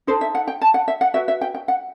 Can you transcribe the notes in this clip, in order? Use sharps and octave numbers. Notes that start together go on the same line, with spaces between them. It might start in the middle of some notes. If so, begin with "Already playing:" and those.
D#4 A4 C5
E5
F#5
G5
A5
F#5
E5
F#5
F#4 B4 E5
E5
G5
G5
F#5